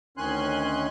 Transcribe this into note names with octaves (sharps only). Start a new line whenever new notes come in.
D2 D#3 C#4 G#5 C6 F#6